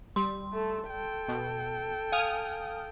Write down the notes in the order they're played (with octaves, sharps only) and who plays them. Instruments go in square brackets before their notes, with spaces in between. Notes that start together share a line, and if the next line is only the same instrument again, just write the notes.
[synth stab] G3 [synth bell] C6
[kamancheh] A3 A4
A4 G5
[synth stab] B2
[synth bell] F5 [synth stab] G#5 D#6 F6